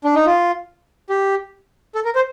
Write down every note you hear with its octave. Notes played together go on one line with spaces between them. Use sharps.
D4
D#4
F4
G4
A4
A#4
C5